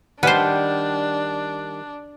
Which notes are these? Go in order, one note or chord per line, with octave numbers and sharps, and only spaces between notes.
D#3 G3 D4 B4 C5 F#5 A5